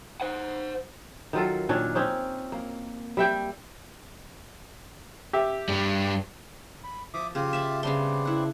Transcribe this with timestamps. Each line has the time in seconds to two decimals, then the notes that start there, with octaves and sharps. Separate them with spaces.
0.21 C5 F#5
1.33 D#3 F#3 F4 A4
1.69 A#2 D#3 C#4 D4
1.95 C4 C#4 D#4
2.52 A#3
3.17 G3 E5 G5
5.33 G4 E5
5.69 G2 G3
6.84 B5
7.14 F3 E5 D6 D#6
7.35 C#3 F4 G4
7.53 E5 A5 B5
7.83 C#3 G3 B3 C4 D4 C6
8.25 E4 F#5